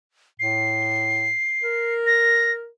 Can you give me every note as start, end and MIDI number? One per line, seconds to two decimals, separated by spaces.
0.40 1.34 45
0.40 1.94 96
1.63 2.67 70
2.07 2.52 94